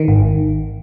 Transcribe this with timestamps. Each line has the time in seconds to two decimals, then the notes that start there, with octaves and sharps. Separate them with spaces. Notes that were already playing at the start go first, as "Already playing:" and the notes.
Already playing: D#3
0.08 G#1